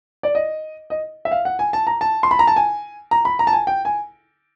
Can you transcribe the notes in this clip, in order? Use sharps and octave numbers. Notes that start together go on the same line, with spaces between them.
D5
D#5
D#5
E5
F5
F#5
G#5
A5
A#5
A5
C6
B5
A#5
A5
G#5
A#5
B5
A#5
A5
G#5
G5
G#5